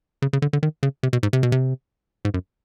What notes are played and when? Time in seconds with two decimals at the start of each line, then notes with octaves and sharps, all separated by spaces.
0.22 C#3
0.33 C#3
0.42 D3
0.53 D3
0.63 D#3
0.83 C#3
1.03 C3
1.13 B2
1.23 G#2
1.33 C3
1.43 B2
1.52 C3
2.25 G#2
2.34 F#2